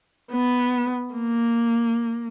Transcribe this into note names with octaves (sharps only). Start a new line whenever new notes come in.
B3
A#3